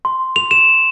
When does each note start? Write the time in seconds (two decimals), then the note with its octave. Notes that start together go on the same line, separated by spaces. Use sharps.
0.05 C6
0.36 F7
0.51 E7